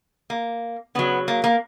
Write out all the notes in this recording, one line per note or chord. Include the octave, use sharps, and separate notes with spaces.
A#3
C#3 F#3 B3
A#3
A#3